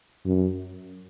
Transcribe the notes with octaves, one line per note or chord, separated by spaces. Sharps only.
F#2